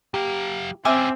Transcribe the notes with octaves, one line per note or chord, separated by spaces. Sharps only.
F#3 G4 F5
C4 C#4 G4 E5 G#5 D6